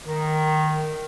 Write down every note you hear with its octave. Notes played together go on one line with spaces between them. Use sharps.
D#3